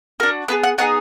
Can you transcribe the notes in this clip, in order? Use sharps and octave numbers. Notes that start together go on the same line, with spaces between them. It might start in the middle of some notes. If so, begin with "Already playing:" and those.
D4 F#4 A#4
B3 D#4 G#4 B4
F#5
B3 D#4 G#4 F#5